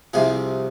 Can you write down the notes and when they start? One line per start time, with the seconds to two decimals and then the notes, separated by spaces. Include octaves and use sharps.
0.13 C2 C3 F3 G#4